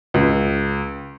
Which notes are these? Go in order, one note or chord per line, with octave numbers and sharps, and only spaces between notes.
C#2